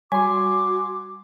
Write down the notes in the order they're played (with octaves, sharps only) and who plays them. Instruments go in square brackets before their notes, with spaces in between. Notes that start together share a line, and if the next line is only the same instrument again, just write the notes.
[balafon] G3 [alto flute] F#4 [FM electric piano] G#5 C6 [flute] D6